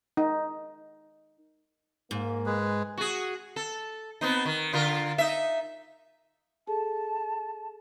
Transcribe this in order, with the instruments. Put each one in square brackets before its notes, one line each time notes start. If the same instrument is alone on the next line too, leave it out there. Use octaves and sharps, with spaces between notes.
[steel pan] D#4
[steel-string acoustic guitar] G#2 [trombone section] A#3
[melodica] G#3 G#4 B4
[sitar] F#4 G#4
A4
B3 C4 D#4
D#3
D3 F4 A#4
D#4 E5
[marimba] G#4 A4 [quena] A5